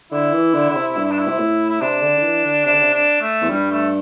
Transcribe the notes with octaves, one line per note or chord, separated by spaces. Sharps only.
D3 E4
E3
D3
D3
C3
G2
E4
D4
E4
C3
A2
E4
C3 D4
D3
D3
E3
D3
C3 D4
D3
C3
D4
A3
E2
G2 G3
A3